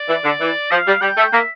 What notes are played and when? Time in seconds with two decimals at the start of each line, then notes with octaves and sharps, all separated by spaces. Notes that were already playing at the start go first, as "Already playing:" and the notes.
Already playing: D5
0.09 E3
0.24 D3
0.40 E3
0.71 F3 F5
0.87 G3
1.02 G3 G5
1.17 A3
1.33 A#3 E5